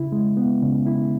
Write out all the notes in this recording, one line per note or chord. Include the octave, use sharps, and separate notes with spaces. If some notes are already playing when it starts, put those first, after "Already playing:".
Already playing: C#3 E4
G#3
B3
C#3
E4